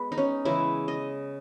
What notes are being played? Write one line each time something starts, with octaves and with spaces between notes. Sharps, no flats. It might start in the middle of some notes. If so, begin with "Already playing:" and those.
Already playing: G#3 B3 B4
D#4
C#4
C#3 E3 G#3 E4
D#5